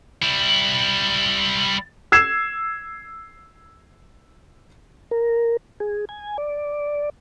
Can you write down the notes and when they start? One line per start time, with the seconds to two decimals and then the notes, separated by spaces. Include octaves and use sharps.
0.22 G3 E4
2.12 E6 G#6 C7 E7
5.11 A#4
5.80 G#4
6.09 G#5
6.38 D5